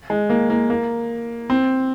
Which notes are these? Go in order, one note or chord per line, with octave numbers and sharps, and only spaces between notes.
G#3
A#3
A#3
A#3
C4